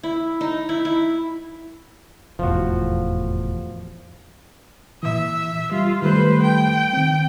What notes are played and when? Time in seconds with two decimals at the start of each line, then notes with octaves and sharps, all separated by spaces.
0.03 E4
0.41 D#4
0.69 E4
0.85 E4
2.39 F1 E2 A2 F3 F#4
5.03 A#2 E3 E5
5.72 G3 F4
6.02 D#3 G3 A3 B4 C5
6.43 G5
6.93 D#3 C4